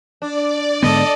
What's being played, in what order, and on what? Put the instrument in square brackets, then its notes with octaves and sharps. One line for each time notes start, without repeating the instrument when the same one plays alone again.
[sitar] D4 [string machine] D5
[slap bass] G#2 D3 B3 [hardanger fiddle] A4 D#5